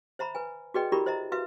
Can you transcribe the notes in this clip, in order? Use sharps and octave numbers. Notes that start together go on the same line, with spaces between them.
C5 E5 A#5 B5
B4 G#5
F#4 G#4 B4 D5 D#5 G5
E4 F#4 G4 A#4 D5 B5
C5 D#5 E5 A#5
F#4 B4 E5 F5